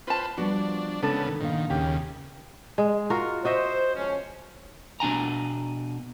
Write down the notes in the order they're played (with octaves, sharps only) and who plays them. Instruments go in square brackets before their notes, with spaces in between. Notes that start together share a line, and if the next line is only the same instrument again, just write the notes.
[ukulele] F4 A5 [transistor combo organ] B4 C5
[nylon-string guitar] F3 G3 B3 [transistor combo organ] D4 [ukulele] F#4
[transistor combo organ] C#3 B3 [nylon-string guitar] G#3 [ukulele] D4 A4
[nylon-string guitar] D#3
[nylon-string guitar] A#2 D3 F5 [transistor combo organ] D#3
[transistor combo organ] D#2 C#3 [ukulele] G4
[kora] G#3
F4 F#4 A#4
[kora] F#4 D#5 E5 [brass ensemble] C5
[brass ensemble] C#2 F3 C#4
[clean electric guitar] B2 D4 G#5 A#5